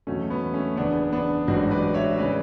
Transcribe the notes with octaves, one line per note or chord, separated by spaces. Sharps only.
E2 B2 F#3 A3 C#4
B3
A3 C#4
F#1 E2 C#3 B3 D4
B3 D4
A1 G#2 F#3 D4 F#4
B4 D5
C#5 E5
E5
C#3 E3 B4 D5